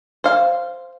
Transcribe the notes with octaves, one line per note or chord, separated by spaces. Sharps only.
C5 F5